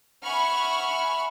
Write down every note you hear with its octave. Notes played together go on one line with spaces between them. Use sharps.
E5 F#5 G#5 B5 C#6 F6